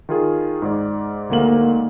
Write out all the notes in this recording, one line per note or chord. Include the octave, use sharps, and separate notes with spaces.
D#3 F4 G#4
G#2 D5
D2 A#3 F#7